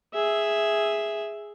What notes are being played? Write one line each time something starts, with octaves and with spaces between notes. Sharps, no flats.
G#4 E5